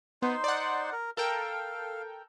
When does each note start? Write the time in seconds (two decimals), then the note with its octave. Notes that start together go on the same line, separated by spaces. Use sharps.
0.22 B3 D#4 C5 C6
0.44 D5 F#5
0.92 A#4
1.17 A4 A#4 F5 G5